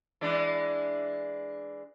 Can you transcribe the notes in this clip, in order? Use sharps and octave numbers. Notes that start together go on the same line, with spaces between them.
E3 G#3 D4